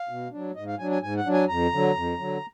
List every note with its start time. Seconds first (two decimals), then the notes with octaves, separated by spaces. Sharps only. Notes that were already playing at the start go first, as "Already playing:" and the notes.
Already playing: F5
0.09 B2
0.32 F#3 D4
0.56 G#2 D#5
0.67 F5
0.79 F#3 D4 G#5
0.91 G#5
1.02 G#2 G#5
1.17 F#5
1.26 F#3 D4
1.33 G#5
1.48 F2 A#5
1.73 D3 F#3
1.96 F2
2.19 D3 F#3